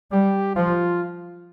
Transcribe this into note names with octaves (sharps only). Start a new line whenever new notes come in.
G3 G4
F3 F4